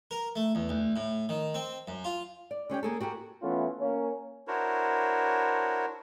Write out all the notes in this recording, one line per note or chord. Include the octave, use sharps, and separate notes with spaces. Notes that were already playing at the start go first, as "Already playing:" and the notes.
A#4
A3
E2
D2
A2
D#3
C4
F#2
F4
D5
D3 C#4 G4 G5
A#3 G#4 A4
F#4 G4 A4 A#4
E3 A3 B3 C#4 F4
A#3 C#4
D4 E4 F#4 A#4 C5 C#5